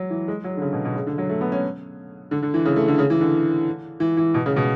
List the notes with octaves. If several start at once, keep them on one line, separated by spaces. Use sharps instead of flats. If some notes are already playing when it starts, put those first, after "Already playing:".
Already playing: F#3
E3
G#3
F#3
D3
C#3
B2
B2
C#3
D3
F#3
A3
B3
C#4
D3
D3
E3
C#3
A3
D3
C#3
E3
D3
E3
E3
B2
C#3
B2